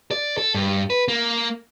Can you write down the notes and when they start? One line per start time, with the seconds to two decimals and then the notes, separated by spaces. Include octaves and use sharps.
0.11 D5
0.38 A4
0.55 G2
0.90 B4
1.08 A#3